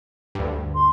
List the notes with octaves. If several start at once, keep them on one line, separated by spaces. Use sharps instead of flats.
D2 G2
C6